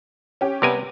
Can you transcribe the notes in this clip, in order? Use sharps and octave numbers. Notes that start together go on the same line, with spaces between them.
C#4 G4
C3 G3 B3 A#4 G#5